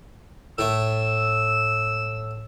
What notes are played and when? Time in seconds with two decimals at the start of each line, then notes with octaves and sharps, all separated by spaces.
0.59 A2 A3 E6